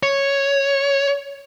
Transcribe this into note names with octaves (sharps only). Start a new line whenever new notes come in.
C#5